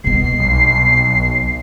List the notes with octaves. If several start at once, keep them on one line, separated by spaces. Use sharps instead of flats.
C2 B2 C7
B1